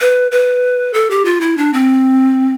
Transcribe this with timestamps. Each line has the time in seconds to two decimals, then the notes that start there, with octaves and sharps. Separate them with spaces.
0.01 B4
0.32 B4
0.94 A4
1.11 G4
1.25 F4
1.41 E4
1.57 D4
1.73 C4